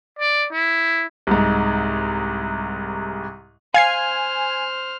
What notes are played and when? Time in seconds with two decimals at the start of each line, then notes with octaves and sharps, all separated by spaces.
0.19 D5
0.52 E4
1.27 C2 G#2
3.74 C5 F5 G#5 F6 G#6 C7